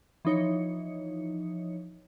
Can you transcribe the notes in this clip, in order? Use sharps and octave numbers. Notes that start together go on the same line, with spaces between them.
E3 F3 D#4 C#5 C#7